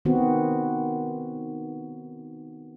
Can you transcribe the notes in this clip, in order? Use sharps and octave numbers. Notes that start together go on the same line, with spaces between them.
D#3 B3 C4 F#4